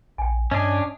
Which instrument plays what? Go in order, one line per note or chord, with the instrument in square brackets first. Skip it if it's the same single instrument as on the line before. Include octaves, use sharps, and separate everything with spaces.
[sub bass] A#1 [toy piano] G5 G#5
[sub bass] G2 [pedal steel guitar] C#4 D4 [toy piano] D#5 D#6 [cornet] G#5